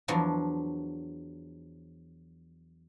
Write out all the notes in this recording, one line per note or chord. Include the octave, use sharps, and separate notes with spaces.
E2 F3 F#3 D4